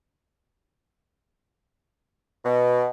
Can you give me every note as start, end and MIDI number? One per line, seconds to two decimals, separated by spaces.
2.45 2.89 47